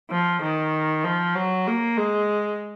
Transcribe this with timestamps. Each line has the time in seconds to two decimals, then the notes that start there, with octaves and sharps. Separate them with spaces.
0.10 F3
0.42 D#3
1.04 F3
1.35 F#3
1.67 A#3
1.98 G#3